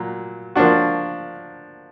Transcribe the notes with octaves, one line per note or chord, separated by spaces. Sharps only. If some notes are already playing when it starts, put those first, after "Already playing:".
Already playing: A#2 F#3
F3 A#3 D4 F#4